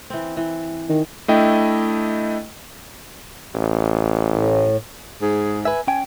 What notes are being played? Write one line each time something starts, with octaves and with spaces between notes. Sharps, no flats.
E3 C4
E3
D#3
A3 D4 E4 D#5 G5
A1
A2
G#2 G#4
B4 E5 G#5
C#4 G5 G#5